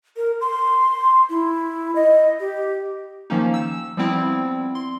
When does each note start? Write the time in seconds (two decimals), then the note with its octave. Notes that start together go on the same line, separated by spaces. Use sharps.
0.17 A#4
0.41 C6
1.29 E4
1.95 D#5
2.40 G4
3.30 D#3 F3 A#3 C#4 D#4
3.54 E6 E7
3.97 F3 G3 B3 C4 E4
4.75 C6